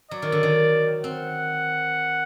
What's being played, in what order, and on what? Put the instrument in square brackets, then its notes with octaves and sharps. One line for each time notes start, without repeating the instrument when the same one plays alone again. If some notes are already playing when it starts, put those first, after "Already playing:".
[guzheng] F#3 [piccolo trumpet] D5
[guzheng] D#3
D3
D#3
[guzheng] C4 [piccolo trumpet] F#5